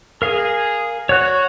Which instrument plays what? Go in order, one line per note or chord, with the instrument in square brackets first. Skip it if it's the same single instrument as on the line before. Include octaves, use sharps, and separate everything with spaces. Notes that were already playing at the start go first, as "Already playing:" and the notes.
[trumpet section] G#4 [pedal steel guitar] A#4 F5
[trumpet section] F#4 [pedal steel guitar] C#5 F#6